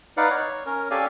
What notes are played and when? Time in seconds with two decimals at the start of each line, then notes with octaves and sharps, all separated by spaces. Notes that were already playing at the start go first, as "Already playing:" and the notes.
0.17 D#4 B4 D5 F5 F#5
0.30 C#5
0.66 C#4 A#4
0.91 C#4 G4 A4 D5 F5 G#5